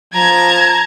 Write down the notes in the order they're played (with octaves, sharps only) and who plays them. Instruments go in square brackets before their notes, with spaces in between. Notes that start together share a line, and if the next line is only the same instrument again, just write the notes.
[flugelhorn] F3 [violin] A5 A#5 [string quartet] G#6